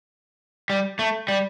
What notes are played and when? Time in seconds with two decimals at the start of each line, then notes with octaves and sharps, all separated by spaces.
0.70 G3
0.99 A3
1.28 G3